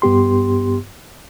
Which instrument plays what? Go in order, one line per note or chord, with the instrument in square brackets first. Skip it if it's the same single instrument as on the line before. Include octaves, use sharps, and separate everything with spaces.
[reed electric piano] G2 B3 G4 C6